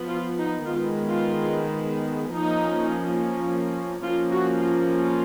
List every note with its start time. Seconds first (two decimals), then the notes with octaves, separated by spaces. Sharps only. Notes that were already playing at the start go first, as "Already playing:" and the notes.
Already playing: F3 B3
0.08 F4
0.37 D#4
0.64 D#3 G#3 B3 F4
1.07 F4
2.34 F3 A#3 C#4 D#4
4.03 F3 A#3 C#4 F4
4.31 F#4
4.59 F4
4.87 F4